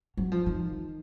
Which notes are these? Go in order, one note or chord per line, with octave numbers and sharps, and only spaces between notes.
F#3
F3
D#3